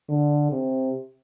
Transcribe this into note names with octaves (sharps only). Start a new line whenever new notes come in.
D3
C3